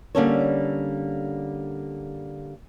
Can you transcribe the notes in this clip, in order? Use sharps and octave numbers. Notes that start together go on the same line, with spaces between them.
D3 G3 A#3 C#4 A4 C#5